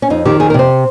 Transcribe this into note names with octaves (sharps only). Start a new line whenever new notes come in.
C#4
F2 D#4
D#3 G4
F2 G#4
A#4
C3 C5